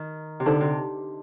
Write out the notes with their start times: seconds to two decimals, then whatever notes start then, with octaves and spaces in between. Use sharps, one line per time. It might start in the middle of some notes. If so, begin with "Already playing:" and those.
Already playing: D#3
0.40 C3
0.46 D3 D#4 A4 C5
0.60 C3